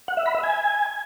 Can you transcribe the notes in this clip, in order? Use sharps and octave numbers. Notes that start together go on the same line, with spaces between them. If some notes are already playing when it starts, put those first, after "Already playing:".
F#5
E5
B5
E5
G#5